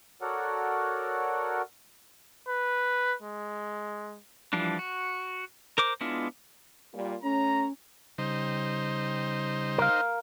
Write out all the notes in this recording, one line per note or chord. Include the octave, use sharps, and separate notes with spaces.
F#4 A4 A#4 C#5 D5 F#5
B4
G#3
E3 F3 G3 D4
F#4
A#4 C5 D6
G#3 B3 D4 E4 F4
A#2 G3 F4
A3 C#4 A#5
C#3 G3 D#4 C5
A#4 F5